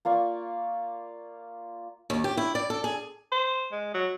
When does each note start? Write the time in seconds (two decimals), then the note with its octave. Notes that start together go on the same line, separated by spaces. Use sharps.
0.05 A#3 F4 D5 C#6
2.10 D#2
2.24 G4
2.37 E4
2.55 D5
2.70 A4
2.84 G#4
3.32 C5
3.72 G#3
3.94 F#3